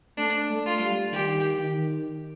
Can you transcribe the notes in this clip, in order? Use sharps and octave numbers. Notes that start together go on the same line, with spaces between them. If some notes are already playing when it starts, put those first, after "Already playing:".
A3 D4
A3
F4
G3
D#3 G4
D#3